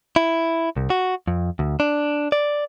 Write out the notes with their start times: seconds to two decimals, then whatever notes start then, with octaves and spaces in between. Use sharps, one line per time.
0.16 E4
0.77 C2
0.90 F#4
1.27 F2
1.59 D2
1.80 D4
2.32 D5